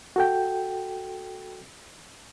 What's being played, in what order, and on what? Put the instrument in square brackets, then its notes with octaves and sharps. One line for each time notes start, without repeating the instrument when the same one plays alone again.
[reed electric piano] F#4 A4 G5